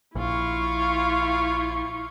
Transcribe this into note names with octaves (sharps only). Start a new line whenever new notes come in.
A#1 E4 F4 C#6